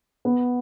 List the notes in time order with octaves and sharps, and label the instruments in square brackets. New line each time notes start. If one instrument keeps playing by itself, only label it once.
[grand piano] B3